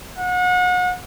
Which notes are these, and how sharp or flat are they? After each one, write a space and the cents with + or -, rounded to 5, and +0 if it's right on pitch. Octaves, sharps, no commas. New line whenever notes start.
F#5 -35